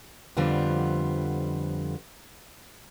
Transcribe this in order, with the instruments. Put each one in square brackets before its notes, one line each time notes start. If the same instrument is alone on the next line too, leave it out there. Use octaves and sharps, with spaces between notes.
[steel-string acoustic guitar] F2 D3 F3 G3 B3 F4